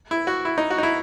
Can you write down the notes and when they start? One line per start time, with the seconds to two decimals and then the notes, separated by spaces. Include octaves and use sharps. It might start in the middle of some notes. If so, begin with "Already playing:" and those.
0.11 E4
0.27 F#4
0.45 E4
0.58 D#4
0.70 F#4
0.78 D#4
0.83 E4